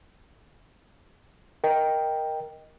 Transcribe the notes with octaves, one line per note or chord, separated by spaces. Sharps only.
A#4 D#5 G5